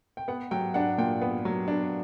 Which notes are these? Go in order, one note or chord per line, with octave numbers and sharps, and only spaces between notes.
G5
B3 F#5
F#3 G5
D4 F#5
A#2 G5
B3
F#3
D4